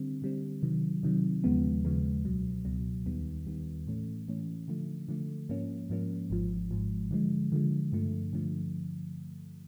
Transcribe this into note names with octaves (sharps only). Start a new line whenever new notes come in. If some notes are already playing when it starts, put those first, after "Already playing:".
Already playing: D3 G3 C4
D3 G3 C4
C3 D#3 F#3
C3 D#3 F#3
D#2 C#3 F3 G#3 B3
D#2 C#3 F3 G#3 B3
C#2 B2 F#3
C#2 B2 F#3
D#2 D#3 G3 B3
D#2 D#3 G3 B3
A2 E3 A3 C#4
A2 E3 A3 C#4
D3 F3 A3
D3 F3 A3
G#2 F3 A#3 C#4
G#2 F3 A#3 C#4
G#1 G#2 F3
G#1 G#2 F3
D3 F3 G#3
D3 F3 G#3
G2 D3 F3 A3
G2 D3 F3 A3